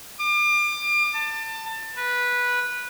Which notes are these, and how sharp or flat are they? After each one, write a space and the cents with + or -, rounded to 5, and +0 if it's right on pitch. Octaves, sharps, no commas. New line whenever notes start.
D6 +35
A5 +25
B4 -10